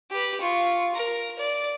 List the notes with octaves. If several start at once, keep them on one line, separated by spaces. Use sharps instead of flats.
G4 B4
F4 C#6
A#4
D5